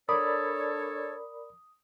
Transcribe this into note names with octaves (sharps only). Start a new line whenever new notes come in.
D4 A4 A#4 C#5 D5 B5 D#6